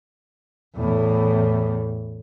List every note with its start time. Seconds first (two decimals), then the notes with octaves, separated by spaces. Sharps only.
0.75 E2 A2